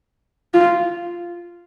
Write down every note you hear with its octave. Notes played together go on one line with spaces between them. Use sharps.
F4